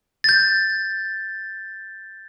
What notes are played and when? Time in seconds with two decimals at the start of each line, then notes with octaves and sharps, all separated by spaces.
0.24 G6 A6